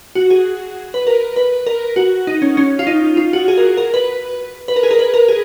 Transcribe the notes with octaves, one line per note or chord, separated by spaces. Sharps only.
F#4
G#4
B4
A#4
B4
A#4
F#4
D#4
C#4
C#4
F4
D#4
F4
F#4
G#4
A#4
A#4
B4
B4
A#4
G#4
A#4
B4
A#4
G#4